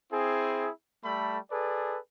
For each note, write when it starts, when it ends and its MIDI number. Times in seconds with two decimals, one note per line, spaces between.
0.11 0.69 60
0.11 0.69 64
0.11 0.69 68
1.04 1.37 55
1.04 1.37 57
1.04 1.37 69
1.04 1.37 83
1.51 1.98 68
1.51 1.98 69
1.51 1.98 71
1.51 1.98 74